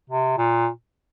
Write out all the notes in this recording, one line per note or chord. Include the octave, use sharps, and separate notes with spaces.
C3
A#2